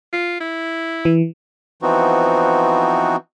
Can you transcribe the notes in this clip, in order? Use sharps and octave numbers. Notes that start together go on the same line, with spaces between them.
F4
E4
E3
E3 F3 B3 C4 D#4 F#4